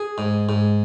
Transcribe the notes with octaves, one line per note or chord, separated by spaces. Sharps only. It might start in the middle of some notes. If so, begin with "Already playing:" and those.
Already playing: G#4
G#2
G#2